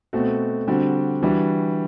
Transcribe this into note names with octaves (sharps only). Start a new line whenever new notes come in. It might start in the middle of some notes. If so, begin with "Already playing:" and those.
B2 A3 C4 F#4
D3 G3 C4 F#4
E3 G3 D4 F#4